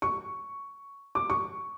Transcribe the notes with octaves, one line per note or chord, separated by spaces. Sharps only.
C#6
D6
C#6